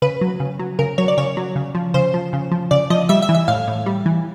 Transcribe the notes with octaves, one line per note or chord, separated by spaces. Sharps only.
C#3 B4
F#3
C#3
F#3
C#3 A#4
F#3 C#5
D5
C#3 C#5
F#3
C#3
F3
C#3 C5
F3
C#3
F3
C#3 D5
F3 D#5
G3 E5
E5
E3
E5
A2 F5
A2
G3
E3